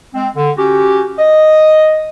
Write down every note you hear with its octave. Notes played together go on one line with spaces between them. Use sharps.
G#3 C4
D3
C#4 F#4 G4
D#5